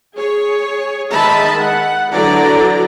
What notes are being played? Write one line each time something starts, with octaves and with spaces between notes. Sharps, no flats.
G#4 C#5
D#3 G#3 D#5 E5 A5 B5
F#5
D3 E3 F#3 D5 A#5